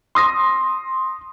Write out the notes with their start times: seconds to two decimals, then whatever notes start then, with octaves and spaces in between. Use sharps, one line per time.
0.15 C6 D#6 A#6